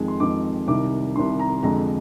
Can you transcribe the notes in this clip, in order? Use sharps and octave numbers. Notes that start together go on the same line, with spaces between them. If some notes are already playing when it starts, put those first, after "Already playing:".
Already playing: F2 D#3 G#3
C6
F2 D#3 G#3 D6
C2 C3 D#3 D6
C2 C3 D#3 C6
A#5
F2 D3 G#3 A#5